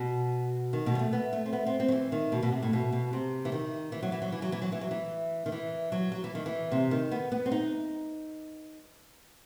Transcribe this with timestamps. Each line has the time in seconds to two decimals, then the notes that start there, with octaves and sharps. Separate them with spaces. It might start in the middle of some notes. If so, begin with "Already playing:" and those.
Already playing: B2
0.73 D#3
0.86 B2
0.95 G3
0.99 A3
1.13 B3
1.33 A3
1.46 C4
1.53 B3
1.67 C4
1.80 C4
1.88 F#3
1.92 E3
2.12 D#3
2.32 B2
2.43 B2
2.52 C3
2.62 A2
2.73 B2
2.93 B2
3.13 C3
3.45 E3
3.52 D#3
3.92 E3
4.03 F#3
4.12 E3
4.22 F#3
4.32 E3
4.42 F#3
4.52 E3
4.62 F#3
4.72 E3
4.81 F#3
4.91 E3
5.46 D#3
5.52 E3
5.92 F#3
6.12 F#3
6.24 E3
6.35 D#3
6.46 E3
6.72 C3
6.91 D#3
7.12 B3
7.32 B3
7.46 C4
7.52 D#4